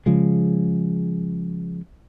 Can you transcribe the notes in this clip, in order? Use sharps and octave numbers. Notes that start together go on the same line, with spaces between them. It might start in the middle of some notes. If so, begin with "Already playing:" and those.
C#3 F3 G#3